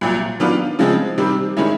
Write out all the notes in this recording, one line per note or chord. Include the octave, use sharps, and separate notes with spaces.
C2 A#2 F#3
D#3 F#3 B3 D4 F4
C#3 F3 G#3 C4
C3 D#3 G3 C4
D#3 G#3 C#4 E4